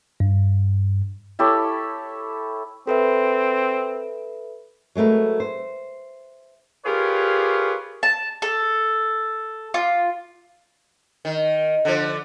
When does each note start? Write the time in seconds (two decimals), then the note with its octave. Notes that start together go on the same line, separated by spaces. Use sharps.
0.20 G2
1.39 E4 G4 A4 C#5
2.87 C4 A4 B4 E5
4.95 F#3 G#3 A3 A#4 B4
5.40 C5
6.86 F4 G4 G#4 A#4 B4 C#5
8.03 A5
8.42 A4
9.74 F4
11.25 D#3
11.85 D3 F3